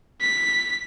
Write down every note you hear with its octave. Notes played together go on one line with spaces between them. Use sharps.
B6